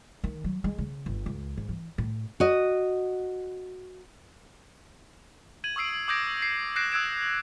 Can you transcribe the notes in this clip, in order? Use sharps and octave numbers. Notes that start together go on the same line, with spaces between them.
D#3
F#3
G#3
C#3
G1
C#2
G#2
E3
A2
F#4 D#5
G#6 D#7 F#7
C#6 D#6 E6 C7 D7
D6 D#6 G6 G#6 A#6 D7
C7
F#6 G6 A#6 C7 D7 E7
D#6 E6 F#6 G#6 D7 E7